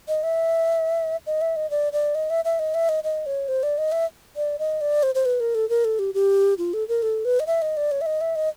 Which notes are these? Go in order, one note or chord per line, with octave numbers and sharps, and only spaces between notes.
D#5
E5
D#5
E5
D#5
D5
D5
D#5
E5
E5
D#5
E5
D#5
D#5
C#5
C5
D5
D#5
E5
D5
D#5
D5
C5
C5
B4
A#4
A4
A#4
A4
G4
G4
F4
A4
A#4
A4
B4
D#5
E5
D#5
D5
C#5
E5
D#5
E5
D#5